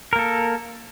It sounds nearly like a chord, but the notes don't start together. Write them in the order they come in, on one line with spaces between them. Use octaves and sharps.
A#4 A#3 A4